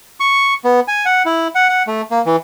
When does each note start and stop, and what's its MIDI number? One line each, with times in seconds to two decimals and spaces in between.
0.20 0.54 85
0.64 0.80 59
0.88 1.05 80
1.05 1.23 78
1.25 1.48 64
1.55 1.69 78
1.69 1.83 78
1.87 2.02 57
2.11 2.22 58
2.26 2.36 52